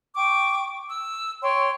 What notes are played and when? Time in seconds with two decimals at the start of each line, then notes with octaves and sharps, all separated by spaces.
0.16 G5 C#6 D6
0.90 E6
1.42 C#5 G5 C6 C#6